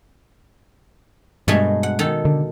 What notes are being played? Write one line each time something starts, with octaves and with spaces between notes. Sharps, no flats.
G2 B2 G#3 A3
F#5
D#3 A4
D3